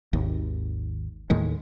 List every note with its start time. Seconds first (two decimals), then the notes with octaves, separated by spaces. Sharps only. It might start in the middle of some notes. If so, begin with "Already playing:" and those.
0.13 G#1 D#2
1.30 D#2 A2 D#3 G#3